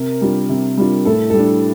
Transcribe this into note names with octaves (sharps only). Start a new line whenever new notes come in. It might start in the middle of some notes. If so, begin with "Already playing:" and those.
Already playing: C3 A#4
G3 D4 F4
C3
G3 D4 F4
A2 A4
G3 A4
D4